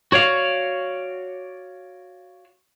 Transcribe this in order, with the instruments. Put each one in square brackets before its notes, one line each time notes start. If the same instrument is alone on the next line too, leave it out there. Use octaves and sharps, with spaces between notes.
[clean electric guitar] F#4 C#5 D5 F5